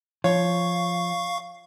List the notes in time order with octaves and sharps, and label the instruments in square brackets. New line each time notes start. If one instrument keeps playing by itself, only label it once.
[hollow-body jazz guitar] F3 [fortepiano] C#5 [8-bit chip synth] F5 C#6